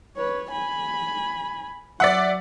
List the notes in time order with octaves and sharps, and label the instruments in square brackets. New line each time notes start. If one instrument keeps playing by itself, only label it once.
[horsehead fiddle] B4 C#5
G#5 B5
[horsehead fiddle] F#3 [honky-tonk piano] D5 E5 F#5